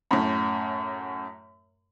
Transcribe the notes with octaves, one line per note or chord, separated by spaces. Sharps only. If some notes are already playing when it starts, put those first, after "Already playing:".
F#2 A2